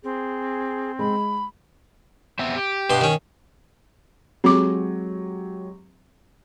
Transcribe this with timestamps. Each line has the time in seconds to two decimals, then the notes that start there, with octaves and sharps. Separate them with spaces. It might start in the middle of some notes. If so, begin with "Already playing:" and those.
0.03 C4 G#4
0.99 G#3 B5
2.39 B3 C4 E5
2.55 G4
2.90 G2 B2 C6
3.01 D#3 C#4
4.44 F#3 G#3 C4 G4 D6